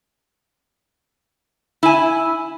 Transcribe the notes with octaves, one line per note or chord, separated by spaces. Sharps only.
E4 G#5